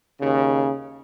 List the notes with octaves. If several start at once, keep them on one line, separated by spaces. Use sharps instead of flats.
D#2 C#3